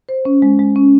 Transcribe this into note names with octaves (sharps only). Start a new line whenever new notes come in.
C5
C#4
G#3
G#3
C#4